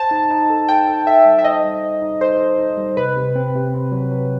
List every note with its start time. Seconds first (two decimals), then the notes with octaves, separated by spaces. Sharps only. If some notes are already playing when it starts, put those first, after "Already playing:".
Already playing: C5 A5
0.11 D#4
0.30 D#4
0.50 A4
0.68 A4 G5
0.87 A4
1.07 A4 E5
1.26 G3
1.39 E5
1.44 C5 D#5
1.64 G3
1.83 C5
2.02 D#4
2.21 A4 C5
2.41 A4
2.59 D#4
2.78 G3
2.97 C3 B4
3.17 C3
3.36 C4
3.55 C3
3.74 C4
3.92 F#3
4.11 F#3